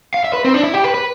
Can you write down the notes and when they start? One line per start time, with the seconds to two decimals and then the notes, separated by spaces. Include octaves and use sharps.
0.14 F5
0.24 E5
0.33 B4
0.45 C4
0.54 D4
0.64 E4
0.74 G4
0.84 B4
0.94 B4